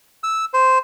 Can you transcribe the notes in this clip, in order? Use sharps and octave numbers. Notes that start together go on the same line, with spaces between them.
E6
C5